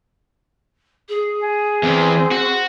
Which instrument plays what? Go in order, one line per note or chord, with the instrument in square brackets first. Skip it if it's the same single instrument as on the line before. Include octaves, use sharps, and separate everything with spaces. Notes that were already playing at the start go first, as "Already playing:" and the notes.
[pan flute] G#4
[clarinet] G#5
[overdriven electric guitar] E2 E3 [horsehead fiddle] C4 C5
[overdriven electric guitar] F#4